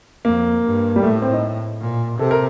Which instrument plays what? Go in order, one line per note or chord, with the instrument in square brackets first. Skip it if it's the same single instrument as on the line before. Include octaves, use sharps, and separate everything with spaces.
[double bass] F2 [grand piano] A#3
[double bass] G2
[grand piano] G3
[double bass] A2 [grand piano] A3
[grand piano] C4
D#4
[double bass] A#2
[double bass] C3 [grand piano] A4
[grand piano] A#4